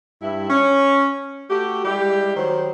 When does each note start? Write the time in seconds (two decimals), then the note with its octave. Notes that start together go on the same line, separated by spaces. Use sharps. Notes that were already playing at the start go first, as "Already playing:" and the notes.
0.22 G2 E4
0.50 C#4
1.50 A3 F#4 G4
1.85 G3 G#3 E4 G4
2.37 D#3 F#3 C5